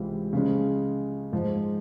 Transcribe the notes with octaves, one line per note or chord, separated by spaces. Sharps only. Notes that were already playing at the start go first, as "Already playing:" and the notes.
Already playing: C#2 C3 E3 G#3 C4
C#3 F3 G#3 C#4
G#2 F3 G#3